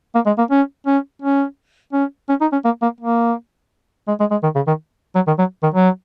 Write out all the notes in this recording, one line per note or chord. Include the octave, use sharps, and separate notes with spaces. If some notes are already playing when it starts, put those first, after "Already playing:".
A#3
G#3
A#3
C#4
C#4
C#4
C#4
C#4
D#4
C#4
A#3
A#3
A#3
G#3
G#3
G#3
D#3
C#3
D#3
F#3
D#3
F#3
D#3
F#3